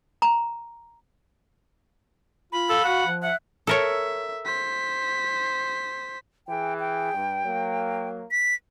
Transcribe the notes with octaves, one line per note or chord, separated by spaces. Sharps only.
A#5
F4 B5
A4 F5
F#4 F#5
F3
E5 F#5
A4 A#4 C#5 E5
C5 B6
E3 G#4 G5
G5
G2
F#3 A#3
B6